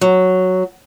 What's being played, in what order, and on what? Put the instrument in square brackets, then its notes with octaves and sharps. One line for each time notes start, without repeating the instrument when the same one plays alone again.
[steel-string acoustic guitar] F#3